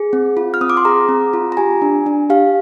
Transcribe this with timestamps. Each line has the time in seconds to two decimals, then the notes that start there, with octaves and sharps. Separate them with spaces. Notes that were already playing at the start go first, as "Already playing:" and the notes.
Already playing: G#4
0.13 C4
0.37 F4
0.54 F6
0.61 C4 D#6
0.70 D6
0.77 C6
0.85 G#4 A#5
1.09 C4
1.33 F4
1.52 A#5
1.57 G4 G#5
1.82 D4
2.06 D4
2.30 G4 F5